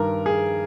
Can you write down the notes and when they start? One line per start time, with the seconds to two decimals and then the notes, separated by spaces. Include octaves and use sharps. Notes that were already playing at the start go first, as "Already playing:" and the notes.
Already playing: G2 D#3 A#4
0.26 G#4